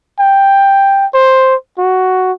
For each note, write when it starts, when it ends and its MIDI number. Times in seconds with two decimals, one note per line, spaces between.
0.20 1.06 79
1.14 1.55 72
1.78 2.32 66